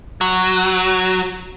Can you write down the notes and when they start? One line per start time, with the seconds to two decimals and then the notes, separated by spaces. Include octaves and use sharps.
0.21 F#3